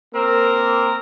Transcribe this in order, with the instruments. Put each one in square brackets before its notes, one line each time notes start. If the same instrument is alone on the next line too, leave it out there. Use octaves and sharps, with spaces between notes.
[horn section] A#3 C4 A#4